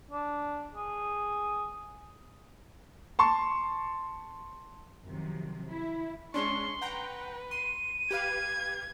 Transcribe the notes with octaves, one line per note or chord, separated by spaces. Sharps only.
D4
G#4
A5 C6 C#6
F#2 C3 D#3 F3 F#3
E4
G#3 C#4 D4 C6 C#6
B4 F#5 G5 A#5
C6 D#7
G4 B4 F5 G#6